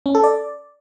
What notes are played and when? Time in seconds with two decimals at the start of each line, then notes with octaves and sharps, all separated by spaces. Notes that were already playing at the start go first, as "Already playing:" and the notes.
0.06 C#4
0.15 A4
0.24 D5